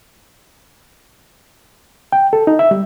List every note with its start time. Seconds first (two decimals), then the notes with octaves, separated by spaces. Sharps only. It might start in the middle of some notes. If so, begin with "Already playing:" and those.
2.12 G5
2.33 A4
2.47 D#4
2.59 E5
2.71 G3